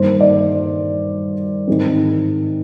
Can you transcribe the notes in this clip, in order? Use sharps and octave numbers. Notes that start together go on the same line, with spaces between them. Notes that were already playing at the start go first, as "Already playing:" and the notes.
Already playing: G2 D#3 A#3 C5
D5
G#2 D#3 G#3 C4